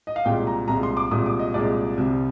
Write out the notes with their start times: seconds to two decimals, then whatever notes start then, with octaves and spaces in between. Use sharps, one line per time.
0.07 D#5
0.16 F5
0.25 C2 A#2 G#3 G5
0.47 A#5
0.68 C2 A#2 G#3 A#5
0.83 C6
0.97 D6
1.11 C2 A#2 G#3 D#6
1.26 D6
1.39 D#5
1.54 C2 A#2 G#3 D5
1.97 C2 C3 G3